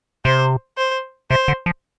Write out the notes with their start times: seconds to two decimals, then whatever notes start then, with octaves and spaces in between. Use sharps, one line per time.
0.25 C3 C5
0.78 C5
1.30 C3 C5
1.48 D3
1.66 F3